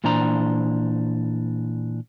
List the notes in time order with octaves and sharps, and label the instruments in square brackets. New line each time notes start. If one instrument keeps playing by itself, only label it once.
[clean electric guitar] A#2 E3 D4 C5 A#5